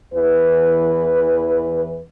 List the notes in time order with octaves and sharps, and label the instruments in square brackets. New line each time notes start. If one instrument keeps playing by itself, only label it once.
[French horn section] E2 E3 B4